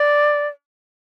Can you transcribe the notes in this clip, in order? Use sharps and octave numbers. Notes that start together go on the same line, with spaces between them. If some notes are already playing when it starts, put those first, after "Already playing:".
Already playing: D5